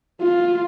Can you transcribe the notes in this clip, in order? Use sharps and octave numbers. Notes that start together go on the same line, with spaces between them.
F4